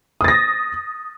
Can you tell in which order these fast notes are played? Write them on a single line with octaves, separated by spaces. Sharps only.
D#6 A6 A#6